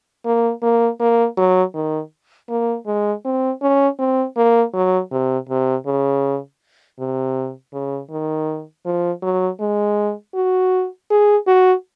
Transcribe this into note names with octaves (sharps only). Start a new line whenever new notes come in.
A#3
A#3
A#3
F#3
D#3
A#3
G#3
C4
C#4
C4
A#3
F#3
C3
C3
C#3
C3
C#3
D#3
F3
F#3
G#3
F#4
G#4
F#4